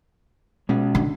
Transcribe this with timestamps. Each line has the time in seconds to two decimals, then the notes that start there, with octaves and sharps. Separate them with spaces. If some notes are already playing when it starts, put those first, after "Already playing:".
0.69 B2 G#3 C#4
0.95 D3